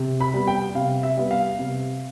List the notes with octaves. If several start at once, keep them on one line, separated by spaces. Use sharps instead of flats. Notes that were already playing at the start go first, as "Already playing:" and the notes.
Already playing: C3
B5
G3 B3
G5
C3 F5
E5
G3 B3
F5
C3